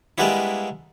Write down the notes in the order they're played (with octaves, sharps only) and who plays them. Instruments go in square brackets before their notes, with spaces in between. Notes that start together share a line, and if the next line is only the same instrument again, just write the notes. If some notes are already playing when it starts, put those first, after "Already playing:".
[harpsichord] G3 G#3 A#3 B3 D4 E4